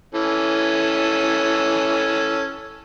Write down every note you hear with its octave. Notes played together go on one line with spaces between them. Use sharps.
E3 C#4 A4